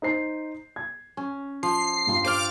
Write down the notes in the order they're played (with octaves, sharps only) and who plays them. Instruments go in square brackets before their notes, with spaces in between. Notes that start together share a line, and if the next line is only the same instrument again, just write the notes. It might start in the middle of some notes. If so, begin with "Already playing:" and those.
[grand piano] D#4 C5 C7
G#6
[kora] C#4
[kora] F3 [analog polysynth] C7
[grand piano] G2 F4 C6
[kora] C5 D5 F5 [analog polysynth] D6 F6